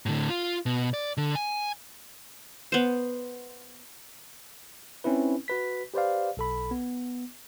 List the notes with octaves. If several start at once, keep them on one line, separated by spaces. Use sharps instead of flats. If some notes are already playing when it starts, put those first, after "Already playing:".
A2 D3
F4
B2
D5
D3
G#5
B3 C5
C4 C#4 D#4 E4 B4
F#4 B4 B6
G4 B4 C5 D5 F5
B1 A4 B5
B3